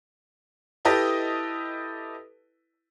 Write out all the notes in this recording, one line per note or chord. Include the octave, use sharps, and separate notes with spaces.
E4 G4 A4 B4 D#5